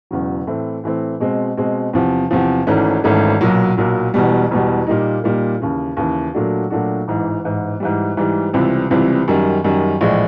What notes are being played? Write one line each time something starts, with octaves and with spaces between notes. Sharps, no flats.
E1 E2 C#3 F#3
A2 E3 A3 C4
A2 E3 A3 C4
B2 G#3 C4
B2 G#3 C4
E2 C3 F3
E2 C3 F3
G#1 G#2 E3 A3 C#4
G#1 G#2 E3 A3 C#4
B1 A#2 F#3
B1 A#2 F#3
E1 E2 B2 G3
E1 E2 B2 G3
A#2 G3 A#3 D#4
A#2 G3 A#3 D#4
D#2 C#3 E3
D#2 C#3 E3
A#2 F#3 A3 D4 F#4
A#2 F#3 A3 D4 F#4
A1 G#2 E3
A1 G#2 E3
G#2 E3 G3
G#2 E3 G3
C#2 C3 E3 G3 C4
C#2 C3 E3 G3 C4
F#2 D#3 G3
F#2 D#3 G3
A#1 A2 E3 G#3